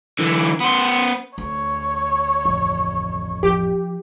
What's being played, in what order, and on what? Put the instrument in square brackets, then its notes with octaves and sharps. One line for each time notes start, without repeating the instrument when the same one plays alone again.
[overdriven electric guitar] D3 E3
B3 C5
[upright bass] D2 [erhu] C#5
[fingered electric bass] A1 F2
[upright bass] F3 [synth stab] G4